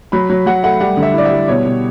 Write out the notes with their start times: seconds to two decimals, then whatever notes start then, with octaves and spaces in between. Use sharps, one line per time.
0.12 F#3 B5
0.30 F#3
0.46 F#3 F#5
0.63 A3 F#5
0.80 G3 F#5
0.97 D3
1.03 E5
1.14 E4 D5
1.25 E5
1.31 G3
1.48 B2 C#5
1.65 B2